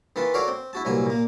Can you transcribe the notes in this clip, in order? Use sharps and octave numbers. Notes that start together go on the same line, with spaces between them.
D#3 E3 F4 B4 A5
F#4 A4 A#4 C#5 D5 F5
C4
E4 F#4 A5
C2 A#2 E3 F#3 G#5
A#2 A#3